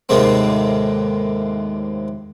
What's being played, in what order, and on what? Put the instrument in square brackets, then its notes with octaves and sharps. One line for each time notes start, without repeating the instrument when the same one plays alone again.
[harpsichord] D#2 A2 C3 G#3 A#3 C4